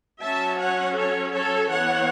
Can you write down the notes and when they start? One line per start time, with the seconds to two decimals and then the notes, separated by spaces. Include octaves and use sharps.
0.20 F#3 C#4 E5 A5
0.58 C#5 F#5
0.96 A4 C#5
1.32 A4 C#5
1.69 E3 B3 C#5 F#5